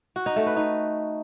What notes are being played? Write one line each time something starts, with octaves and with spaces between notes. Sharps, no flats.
F#4
D#4
A3
B4
D#4